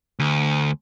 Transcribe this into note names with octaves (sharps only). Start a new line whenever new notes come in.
D2